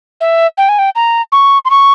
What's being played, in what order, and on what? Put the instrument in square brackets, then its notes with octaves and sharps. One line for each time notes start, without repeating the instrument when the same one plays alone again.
[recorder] E5
G5
G#5
G5
A#5
C#6
C6
C#6